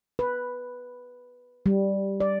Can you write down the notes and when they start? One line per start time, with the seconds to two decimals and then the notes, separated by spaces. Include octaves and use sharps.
0.19 B4
1.66 G3
2.20 D5